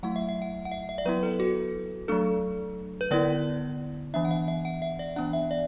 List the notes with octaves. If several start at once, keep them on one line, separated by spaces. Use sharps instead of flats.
F#3 A3 E4 F#5
E5
E5
F#5
F#5
E5
E5
D5
F#3 B3 E4 B4
A4
F#4
F#3 A3 D4 A4
B4
D3 B3 E4 D5
E3 B3 D4 E5
F#5
E5
E5
F#5
E5
D5
E3 B3 D4 F#5
E5
D5